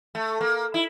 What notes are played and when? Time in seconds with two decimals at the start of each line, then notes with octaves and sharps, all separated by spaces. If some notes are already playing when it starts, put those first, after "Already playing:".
0.15 A3
0.41 A#3
0.74 E4